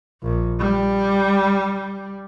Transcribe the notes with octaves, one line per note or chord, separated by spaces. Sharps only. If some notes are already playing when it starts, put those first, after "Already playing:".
A#1
G3